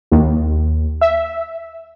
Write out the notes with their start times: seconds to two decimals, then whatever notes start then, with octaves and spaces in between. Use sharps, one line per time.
0.12 D#2
1.01 E5